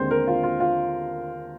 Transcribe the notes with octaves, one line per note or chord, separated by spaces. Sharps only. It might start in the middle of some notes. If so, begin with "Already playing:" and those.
Already playing: D#2 D3 G#3 C4 C5
A#4
F4
F4
F4